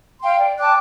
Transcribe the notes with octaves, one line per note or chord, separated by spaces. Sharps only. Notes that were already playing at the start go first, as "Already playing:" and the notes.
F5 G5 C6
D5
G5 A5 D6 F#6